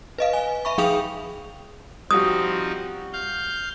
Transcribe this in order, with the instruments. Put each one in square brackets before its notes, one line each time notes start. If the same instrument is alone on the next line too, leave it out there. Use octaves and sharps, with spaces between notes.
[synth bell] B4 D#5 F5
G#5
E5 B5 C#6
F3 G#4 F5 G5 D#6 F7
[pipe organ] F3 C4 D#4 [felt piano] G3 F#4 [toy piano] D#6
[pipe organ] F5 G6